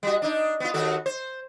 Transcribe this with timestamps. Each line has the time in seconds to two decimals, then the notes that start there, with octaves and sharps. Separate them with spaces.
0.03 G3 F#4
0.22 D4 D#4
0.60 B3 F4
0.74 D#2 F#4 A4
1.06 C5